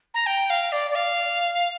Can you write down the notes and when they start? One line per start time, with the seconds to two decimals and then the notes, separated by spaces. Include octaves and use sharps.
0.14 A#5
0.26 G5
0.50 F5
0.72 D5
0.90 D5
0.95 F5